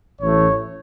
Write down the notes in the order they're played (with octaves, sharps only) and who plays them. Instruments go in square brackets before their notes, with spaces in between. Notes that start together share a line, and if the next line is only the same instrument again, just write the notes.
[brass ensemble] A1 A2 E3 A3 C#5